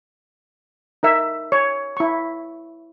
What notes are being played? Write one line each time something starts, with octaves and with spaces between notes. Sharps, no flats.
D#4 A#4 E5
C#5
E4 C#6